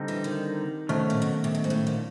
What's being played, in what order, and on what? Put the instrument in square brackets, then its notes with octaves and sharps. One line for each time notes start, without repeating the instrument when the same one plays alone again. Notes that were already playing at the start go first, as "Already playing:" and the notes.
Already playing: [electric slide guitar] D3 G3 C4 D#4
[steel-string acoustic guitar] E3
D#3
[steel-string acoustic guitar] C3 [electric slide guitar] D#3 F#3 A3 C#4
[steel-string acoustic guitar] A#2
B2
C3
B2
G#2
A2
A#2